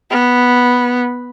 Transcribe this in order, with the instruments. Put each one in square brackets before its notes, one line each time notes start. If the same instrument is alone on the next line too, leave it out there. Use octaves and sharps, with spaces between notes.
[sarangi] B3